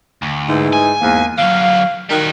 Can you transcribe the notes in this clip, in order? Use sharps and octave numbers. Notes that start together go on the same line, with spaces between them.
D2
G#2 E3 D#4
G#5
E2 G#2 A#3
D3 F#3 F5
D#3 G3 F#4